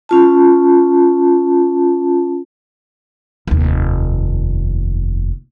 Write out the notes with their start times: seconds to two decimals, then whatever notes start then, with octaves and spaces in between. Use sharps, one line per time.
0.09 C#4 F4 A5
3.47 F1 D#2